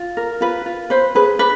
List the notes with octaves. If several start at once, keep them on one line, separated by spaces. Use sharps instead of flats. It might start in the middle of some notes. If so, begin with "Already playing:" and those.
Already playing: F4
A#4
F4 B4
F4
B4 C5
G#4 B4
D4 B4